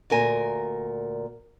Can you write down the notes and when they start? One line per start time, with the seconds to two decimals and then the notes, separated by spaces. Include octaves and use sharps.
0.10 D2 A#2 A#4 G#5